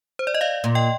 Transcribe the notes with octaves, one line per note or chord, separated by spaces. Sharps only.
C5
D5
D#5
D5 F5
A#2
D#5 G5